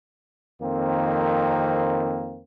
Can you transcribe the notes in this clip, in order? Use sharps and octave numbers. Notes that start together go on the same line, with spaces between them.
F2 D#3 A#3 C4